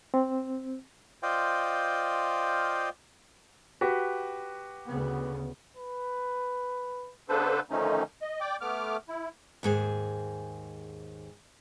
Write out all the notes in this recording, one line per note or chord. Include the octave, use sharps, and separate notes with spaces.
C4
F4 C5 D5 D#5 F5 G5
F#4 G4 B4
D2 C#3 B3
B4
C#3 B3 D4 A4 B4 C5
D3 D#3 F3 A3 C#4 D#4
D#5
D5 G5 D6
A3 B3 D6 F6
E4
D#2 G#2 G#4